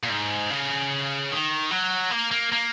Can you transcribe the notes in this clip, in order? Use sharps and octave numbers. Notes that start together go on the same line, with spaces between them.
A#2
G#2
C#3
D#3
F#3
A#3
A#3
A#3